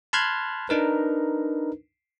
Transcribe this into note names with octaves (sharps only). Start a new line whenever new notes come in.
A5 B5 C6 F6 F#6 G#6
D4 D#4 A#4 B4